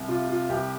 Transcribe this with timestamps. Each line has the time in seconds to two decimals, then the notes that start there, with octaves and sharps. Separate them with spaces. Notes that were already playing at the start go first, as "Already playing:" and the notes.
Already playing: C2
0.08 C3 F4
0.29 F4
0.49 C2 G4